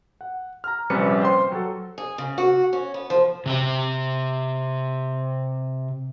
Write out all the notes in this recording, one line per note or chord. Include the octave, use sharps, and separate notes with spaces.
F#5
A#5 F6
A#1 C3 G3 C#4 B4 C#7
C5 G5 C6
F#3 A4
G#4
C#3
F#4
C#4
B3
F3
C3 C4 G4